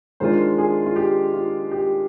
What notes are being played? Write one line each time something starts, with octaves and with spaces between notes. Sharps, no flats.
D#3 G#3 D4 F4 C5
G#4
F4
G4
F4
G4